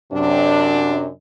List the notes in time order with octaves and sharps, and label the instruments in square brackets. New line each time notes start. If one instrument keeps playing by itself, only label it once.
[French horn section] F#2 C3 D4